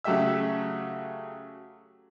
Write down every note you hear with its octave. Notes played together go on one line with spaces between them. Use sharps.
C#3 F#3 A3 G4 E5 E6